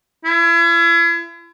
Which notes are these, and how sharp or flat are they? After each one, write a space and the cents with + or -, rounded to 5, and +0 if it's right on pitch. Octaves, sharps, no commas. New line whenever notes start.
E4 +40